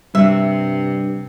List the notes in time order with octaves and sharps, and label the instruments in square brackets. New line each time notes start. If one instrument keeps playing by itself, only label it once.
[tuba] G2 [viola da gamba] C3 [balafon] G3 [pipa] E5